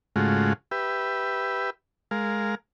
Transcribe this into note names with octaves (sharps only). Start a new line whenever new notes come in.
G#2 C#3 G#3 A3 F4 F#4
G4 B4 E5
G#3 A#4 F5